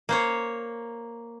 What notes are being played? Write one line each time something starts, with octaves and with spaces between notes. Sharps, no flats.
A#3 C5 C#5